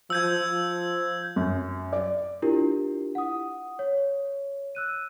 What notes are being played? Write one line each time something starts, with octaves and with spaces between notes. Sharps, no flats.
F3 E6 G6 G#6
F3
F#2
D5
D4 E4 F4 G4 A#4
F#5 D#6
C#5
E6 F#6 D#7